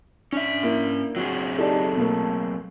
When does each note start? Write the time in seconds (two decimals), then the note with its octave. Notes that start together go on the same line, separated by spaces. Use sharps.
0.33 C#4 D4 E5
0.63 A#3 E4
1.16 F#3 C4 F#4 G#4
1.58 D#4 G4 A4 D5 A5
1.95 B2 A3 A#3